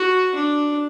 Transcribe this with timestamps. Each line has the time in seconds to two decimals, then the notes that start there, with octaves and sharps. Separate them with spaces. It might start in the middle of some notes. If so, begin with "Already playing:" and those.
Already playing: F#4
0.35 D4